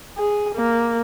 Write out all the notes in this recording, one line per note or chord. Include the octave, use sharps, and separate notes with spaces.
G#4
A#3